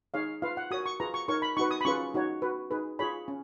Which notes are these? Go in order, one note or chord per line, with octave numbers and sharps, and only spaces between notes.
D#4 G#4 C#5 F5
F4 B4 F5
F#5
F#4 A#4 C#5 D#6
C#6
F4 G#4 B4 A#5
C#6
D#4 A#4 C#5 C#6
B5
D#4 F#4 B4 C#6
D#6
B5
C#4 F4 G#4 B4 C#6
D#4 F#4 C#5
F#4 B4
D#4 G#4 B4
F4 G#4 C#5 B5
C#4